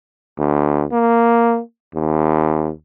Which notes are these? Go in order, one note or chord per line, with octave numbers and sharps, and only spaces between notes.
D2
A#3
D#2